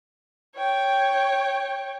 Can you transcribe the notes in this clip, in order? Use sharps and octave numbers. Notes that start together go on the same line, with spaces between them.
C#5 G5